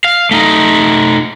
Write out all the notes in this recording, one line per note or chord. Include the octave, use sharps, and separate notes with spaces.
F5
A3 D#4